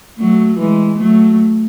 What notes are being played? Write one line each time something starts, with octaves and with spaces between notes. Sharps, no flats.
F#3 A3
E3 G#3
F#3 A3